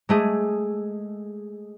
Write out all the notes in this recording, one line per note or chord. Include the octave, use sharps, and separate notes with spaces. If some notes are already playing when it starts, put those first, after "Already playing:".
G#3 A3 G#4